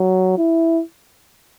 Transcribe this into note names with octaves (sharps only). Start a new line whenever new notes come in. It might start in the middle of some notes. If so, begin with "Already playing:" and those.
Already playing: F#3
E4